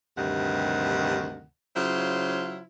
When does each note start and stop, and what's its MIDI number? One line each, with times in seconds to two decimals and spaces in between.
0.17 1.44 38
0.17 1.44 43
0.17 1.44 48
0.17 1.44 51
0.17 1.44 78
1.75 2.63 49
1.75 2.63 54
1.75 2.63 64
1.75 2.63 65
1.75 2.63 72